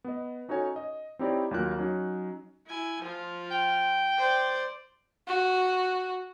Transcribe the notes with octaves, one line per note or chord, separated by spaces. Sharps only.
B3 D#5
C#4 D#4 F#4 A4 C#5 G#5
D#5
C4 D#4 E4 G4 C#5 D5
D#2 F#3 A#3 F4 A#4 F#6
F#3 C#4 D#4
E4 G#5
F3 F4
G5
C5 D5
F#4